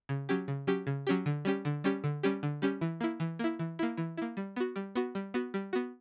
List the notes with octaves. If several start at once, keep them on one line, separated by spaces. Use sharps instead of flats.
C#3
F#3 C#4 G4
C#3
F#3 C#4 G4
C#3
F#3 C#4 G4
D3
G3 C#4 G4
D3
G3 C#4 G4
D3
G3 C#4 G4
D3
G3 C#4 G4
E3
A#3 E4
E3
A#3 E4
E3
A#3 E4
E3
A#3 E4
G3
B3 F#4
G3
B3 F#4
G3
B3 F#4
G3
B3 F#4